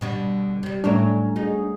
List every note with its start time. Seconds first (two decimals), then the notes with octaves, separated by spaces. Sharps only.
0.01 B2 D3 G3
0.63 C3 G3
0.84 A2 F#3 G3 A3 C#4 D4 A#4
1.36 D#4 F#4 G#4